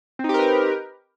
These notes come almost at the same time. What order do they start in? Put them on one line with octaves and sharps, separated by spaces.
C4 D#4 G4 A#4 B4